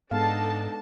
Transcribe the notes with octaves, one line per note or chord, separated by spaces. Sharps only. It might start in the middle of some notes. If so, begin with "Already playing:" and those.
G#2 G#3 B3 D4 D#4 A4 F5 A5